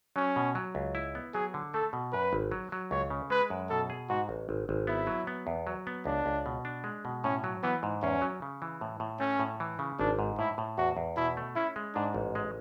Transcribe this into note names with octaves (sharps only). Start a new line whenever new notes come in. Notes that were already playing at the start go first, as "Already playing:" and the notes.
F#3 C#4
B2
F#3
C#2
E4
B3
F#3 G#4
D3
A3 A4
B2
F#2 B4
G#1
F#3
F#3
C#2 C#5
C#3
G#3 B4
F#2
B2 A4
G#4
G#2 F#4
A1
G#1
G#1
B3 E4
F#3
B3
E2
F#3
B3
C#2 D4
C#2
B2
D4
G#3
B2
A2 C#4
F#3
E3 B3
G#2
E2 C#4
F#3
C#3
E3
A2
A2
A3 C#4
A2
E3
C#3
G#1 D4
G#2
A2 E4
A2
E2 F#4
E2
B2 E4
A3
C#4 E4
G#3
G#2 D4
A1
G#3